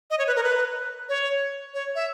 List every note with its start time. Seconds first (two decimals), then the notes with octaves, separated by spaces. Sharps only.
0.10 D#5
0.19 C#5
0.27 B4
0.36 A#4
0.44 B4
1.09 C#5
1.74 C#5
1.95 E5